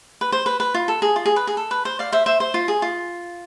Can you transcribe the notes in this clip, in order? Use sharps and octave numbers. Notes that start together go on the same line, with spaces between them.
B4
C5
B4
B4
F4
A4
G#4
F4
G#4
B4
G#4
A4
B4
C5
D5 F5
C5 E5
C5 E5
C5
F4
G#4
F4